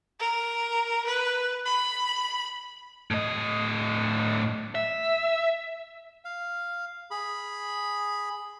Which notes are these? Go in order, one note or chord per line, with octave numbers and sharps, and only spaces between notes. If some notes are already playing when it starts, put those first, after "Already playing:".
A#4
B4
B5
A2 D#5
E5
F5
G#4 B5